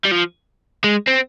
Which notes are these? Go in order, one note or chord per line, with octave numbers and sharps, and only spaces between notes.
G3
F3
G#3
C4